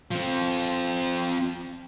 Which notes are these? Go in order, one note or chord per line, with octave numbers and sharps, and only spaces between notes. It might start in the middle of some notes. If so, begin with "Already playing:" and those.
F3 C4